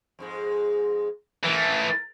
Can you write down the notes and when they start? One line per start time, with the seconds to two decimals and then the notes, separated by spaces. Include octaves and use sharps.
0.19 F2 G#2 G#3
1.44 E3 A3 A#4